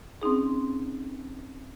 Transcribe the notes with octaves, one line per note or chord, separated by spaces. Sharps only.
C4 C#4 D#4 G#4